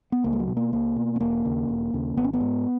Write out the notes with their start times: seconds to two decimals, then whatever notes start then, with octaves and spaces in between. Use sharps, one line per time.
0.12 B3
0.24 C#2 A#3
0.33 G#3
0.40 F#3
0.48 B2
0.57 A#3
0.72 C#2 A#3
0.96 B2
1.16 B3
1.20 E1 A#3
1.45 D#2 C#3
1.69 E1
1.93 D#2 C#3
2.17 G#1 B3
2.24 C#4
2.33 B3
2.41 G#2